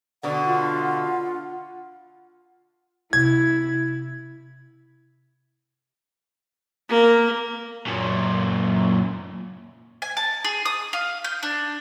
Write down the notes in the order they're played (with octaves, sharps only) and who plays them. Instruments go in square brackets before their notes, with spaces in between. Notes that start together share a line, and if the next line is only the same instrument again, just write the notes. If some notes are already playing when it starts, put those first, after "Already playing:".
[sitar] B2 D3 [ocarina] F#5
[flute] F4
[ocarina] F#5
[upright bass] C3 B3 [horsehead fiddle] E4 [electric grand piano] G#6
[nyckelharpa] A#3
[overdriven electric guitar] F#2 A#2
[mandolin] G#5
A5
G#4
D#6
F5
G6
D4